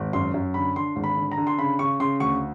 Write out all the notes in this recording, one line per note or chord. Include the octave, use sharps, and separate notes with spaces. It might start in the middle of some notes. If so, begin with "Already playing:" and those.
Already playing: G#1
F#2 C6
F#2
D3 B5
D3 C6
G#1
B5
D3
A#5
D3
C6
C#3 B5
C#3 C#6
C#3 C6
D2 C#6